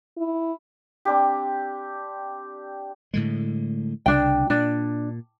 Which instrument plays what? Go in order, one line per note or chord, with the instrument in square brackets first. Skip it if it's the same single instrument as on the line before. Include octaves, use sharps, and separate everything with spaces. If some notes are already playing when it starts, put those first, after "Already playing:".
[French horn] E4
[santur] C4 D4 G4
[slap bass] A2 D3 G#3
[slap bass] C2 C#3 [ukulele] D4 G5
[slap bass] A#2 [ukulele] D4